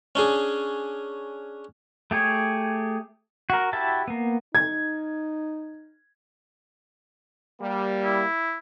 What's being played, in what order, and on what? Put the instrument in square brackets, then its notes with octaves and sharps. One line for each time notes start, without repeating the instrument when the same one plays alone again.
[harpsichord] C#4 D4 G#4
[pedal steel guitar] A3 G4 G#4 C#5
F#4 A#4
E4 F#4 G4 E5 A5
A#3 B3
[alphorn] D#4 [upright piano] G#6
[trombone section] G3 A#3
[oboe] E4